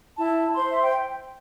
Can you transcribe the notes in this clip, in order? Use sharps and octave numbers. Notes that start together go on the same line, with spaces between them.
E4 A5
C5 C6
E5
G5